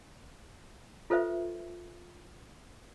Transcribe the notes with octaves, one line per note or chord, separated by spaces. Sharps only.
F4 A4 B4 C5 E5